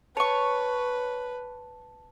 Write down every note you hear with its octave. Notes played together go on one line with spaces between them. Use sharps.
B4 C#5 A5 C#6